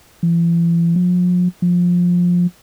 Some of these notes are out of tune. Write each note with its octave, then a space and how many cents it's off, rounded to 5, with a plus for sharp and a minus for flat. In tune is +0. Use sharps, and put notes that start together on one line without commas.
E3 +40
F3 +40
F3 +15